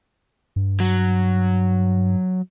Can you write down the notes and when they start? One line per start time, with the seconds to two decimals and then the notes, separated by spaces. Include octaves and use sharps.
0.56 G2
0.80 F#3